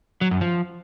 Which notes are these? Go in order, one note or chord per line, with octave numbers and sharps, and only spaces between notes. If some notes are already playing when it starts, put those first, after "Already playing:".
F#3
F#2
F3